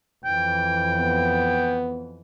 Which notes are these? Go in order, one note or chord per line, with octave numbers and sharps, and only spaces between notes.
F2 E3 G5
B3